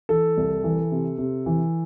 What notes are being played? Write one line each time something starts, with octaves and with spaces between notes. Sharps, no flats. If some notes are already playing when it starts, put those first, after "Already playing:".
E3 A4
C2
E3
C3
C3
E3